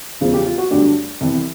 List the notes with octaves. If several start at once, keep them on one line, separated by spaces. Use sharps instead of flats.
E2 C#3 F3 G#3
G4
F4
F#4
G2 D3 F#3 A3 D4 G4
C2 C3 E3